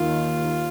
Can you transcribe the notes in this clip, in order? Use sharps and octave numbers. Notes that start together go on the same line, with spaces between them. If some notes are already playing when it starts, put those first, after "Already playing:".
Already playing: D#2 D#3 F4